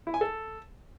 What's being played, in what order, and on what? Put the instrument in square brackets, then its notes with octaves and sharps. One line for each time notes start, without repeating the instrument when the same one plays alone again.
[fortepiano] E4
G#5
A4